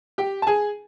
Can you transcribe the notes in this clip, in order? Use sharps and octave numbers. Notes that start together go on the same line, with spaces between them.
G4 G5
A5
G#4 G#5